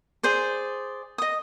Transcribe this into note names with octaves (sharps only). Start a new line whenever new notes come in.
G#4 C5 D5
D#5 D#6